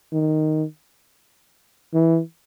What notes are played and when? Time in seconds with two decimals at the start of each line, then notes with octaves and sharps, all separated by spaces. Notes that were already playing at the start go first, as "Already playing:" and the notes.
0.13 D#3
1.94 E3